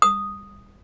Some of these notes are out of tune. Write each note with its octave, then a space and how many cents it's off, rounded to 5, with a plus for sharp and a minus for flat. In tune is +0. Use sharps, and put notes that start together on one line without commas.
D#6 -5